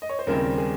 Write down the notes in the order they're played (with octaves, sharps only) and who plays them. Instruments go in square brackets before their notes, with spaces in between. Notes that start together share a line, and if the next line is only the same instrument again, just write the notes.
[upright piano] D#5
C#5
C5
D#2 C#3 G3 C4 A#4
G#4